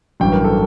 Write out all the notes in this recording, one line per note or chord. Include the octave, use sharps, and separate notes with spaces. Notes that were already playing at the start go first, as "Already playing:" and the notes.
A1 G2 F#3 G5
A#4
A4